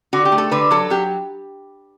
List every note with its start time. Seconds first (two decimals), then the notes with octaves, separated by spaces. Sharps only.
0.13 D3 F#4
0.25 G4
0.32 A3
0.38 A4
0.51 D3 B4
0.71 F#3 A4
0.90 F#3 G4